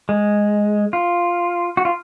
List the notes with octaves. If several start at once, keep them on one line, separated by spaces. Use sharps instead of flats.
G#3
F4
F#4
F4